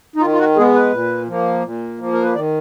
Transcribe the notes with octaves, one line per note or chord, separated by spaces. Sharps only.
D#4
D#3 F4
F4
F#4
G#3 B3 G#4
B4
A#2
F3 A#3
A#2
F3 A#3
A#4
B4
D#3 D5